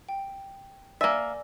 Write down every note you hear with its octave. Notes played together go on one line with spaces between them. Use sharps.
G5
A#3 D5 E5 G#5 A#6